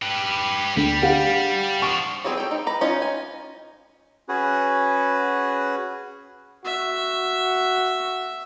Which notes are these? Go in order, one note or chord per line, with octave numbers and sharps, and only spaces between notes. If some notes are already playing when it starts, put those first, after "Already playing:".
G4 B4
D2 G3
G4 F5 F#5
F3 D4 C#6
F#3 B3 C4 G#4
A4 G5
D#4
B4 A#5
C#4 D#4 F4 D#5
G#5
C#4 F#4 G#4 B4
F#4 E5